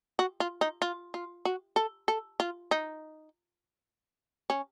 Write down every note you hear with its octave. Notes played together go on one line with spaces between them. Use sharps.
F#4
F4
D#4
F4
F4
F#4
A4
A4
F4
D#4
C#4